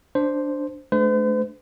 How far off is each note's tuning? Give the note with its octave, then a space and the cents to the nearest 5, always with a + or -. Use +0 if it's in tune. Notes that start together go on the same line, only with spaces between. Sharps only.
D4 +0 C5 +0
A3 -30 D4 +0 C5 -45